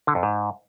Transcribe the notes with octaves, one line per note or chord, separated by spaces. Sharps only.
D3
F2
G#2